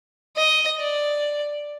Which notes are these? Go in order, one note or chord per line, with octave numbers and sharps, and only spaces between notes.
D#5
D5